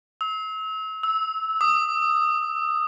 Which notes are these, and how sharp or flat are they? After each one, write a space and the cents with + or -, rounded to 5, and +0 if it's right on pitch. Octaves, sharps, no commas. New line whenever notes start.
E6 -35
E6 -15
D#6 -15